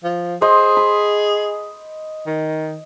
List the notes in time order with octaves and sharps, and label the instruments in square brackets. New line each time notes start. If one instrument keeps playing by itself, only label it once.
[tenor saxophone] F3
[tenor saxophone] G#4 [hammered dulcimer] C5 D#5
[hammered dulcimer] B5
[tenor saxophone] D#3